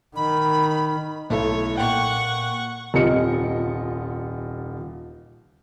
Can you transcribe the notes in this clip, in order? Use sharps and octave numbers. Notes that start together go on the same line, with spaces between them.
D#3 B5
B1 A3 E4 C#5
A#2 F#5 G5 C#6
D#1 C2 F4 D#5 C#7